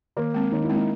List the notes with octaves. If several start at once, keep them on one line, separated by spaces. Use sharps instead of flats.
D#3 A#3
G#3 C4
D#3 D#4
E4
G#3 C4
D#4